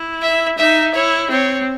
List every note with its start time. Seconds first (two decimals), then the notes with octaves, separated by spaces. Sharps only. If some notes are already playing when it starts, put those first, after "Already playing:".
Already playing: E4
0.22 E5
0.58 D#4 E5
0.94 E4 C#5
1.30 C4 C#5